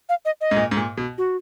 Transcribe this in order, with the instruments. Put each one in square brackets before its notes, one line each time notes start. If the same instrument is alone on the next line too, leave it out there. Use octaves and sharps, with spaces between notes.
[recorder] F5
D#5
D#5
[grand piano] G#2
A#2
G#2
A#2
B2
[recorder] F#4